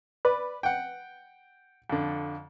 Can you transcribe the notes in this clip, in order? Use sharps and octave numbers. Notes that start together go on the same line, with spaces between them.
B4 D5
F#5 G5
F2 D3